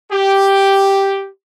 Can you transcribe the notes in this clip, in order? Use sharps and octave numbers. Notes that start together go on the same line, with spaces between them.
G4